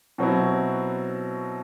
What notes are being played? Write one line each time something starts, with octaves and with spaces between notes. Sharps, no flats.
B2 F#3 C4 E4